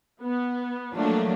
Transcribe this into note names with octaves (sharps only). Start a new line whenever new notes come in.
B3
F3 F#3 A3 A#3 D4